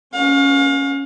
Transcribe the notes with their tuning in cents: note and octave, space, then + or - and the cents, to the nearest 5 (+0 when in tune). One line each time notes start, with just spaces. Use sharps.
C#4 +0 F5 +35